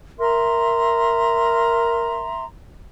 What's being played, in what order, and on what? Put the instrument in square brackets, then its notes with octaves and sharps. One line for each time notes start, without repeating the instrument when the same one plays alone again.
[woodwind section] A#4 [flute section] E5 A#5 C6